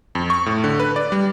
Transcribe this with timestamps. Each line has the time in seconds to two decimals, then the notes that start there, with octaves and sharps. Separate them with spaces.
0.15 F2
0.30 C#6
0.46 A2
0.64 D3
0.80 B4
0.96 D5
1.12 G3